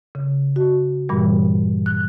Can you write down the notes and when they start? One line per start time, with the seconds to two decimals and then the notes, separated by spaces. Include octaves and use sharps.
0.15 C#3
0.56 F#4
1.09 G2 A#2 E3 G3
1.86 F#6